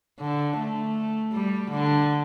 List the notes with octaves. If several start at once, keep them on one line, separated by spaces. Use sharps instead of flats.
D3
A3
G3
D3